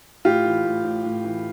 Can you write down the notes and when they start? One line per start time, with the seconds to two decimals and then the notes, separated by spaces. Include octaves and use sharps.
0.25 A2 F4 G4
0.45 E3
0.65 A2
0.84 A2
1.05 A2
1.24 E3